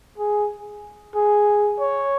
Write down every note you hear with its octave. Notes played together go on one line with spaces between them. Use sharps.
G#4
G#4
C#5